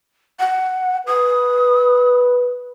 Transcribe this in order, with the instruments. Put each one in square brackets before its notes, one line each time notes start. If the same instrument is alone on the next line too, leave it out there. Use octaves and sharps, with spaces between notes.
[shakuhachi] F#5
[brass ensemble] B4 [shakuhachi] D#6